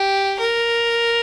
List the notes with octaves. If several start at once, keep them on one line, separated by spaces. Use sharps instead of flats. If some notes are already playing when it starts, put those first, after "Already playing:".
Already playing: G4
A#4